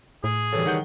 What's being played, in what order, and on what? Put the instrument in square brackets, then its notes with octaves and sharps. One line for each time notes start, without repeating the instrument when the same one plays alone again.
[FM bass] A2 [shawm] G#4
[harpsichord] C#3 E3 G3 [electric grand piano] A4
[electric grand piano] D#3 F#5 G6